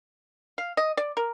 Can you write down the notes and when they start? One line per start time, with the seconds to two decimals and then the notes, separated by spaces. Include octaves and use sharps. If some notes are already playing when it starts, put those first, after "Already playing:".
0.58 F5
0.77 D#5
0.97 D5
1.17 A#4